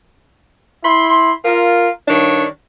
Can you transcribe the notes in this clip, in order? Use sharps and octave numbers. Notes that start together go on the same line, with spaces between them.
E4 B5 C6
F4 A#4
G2 D#3 D4 C#5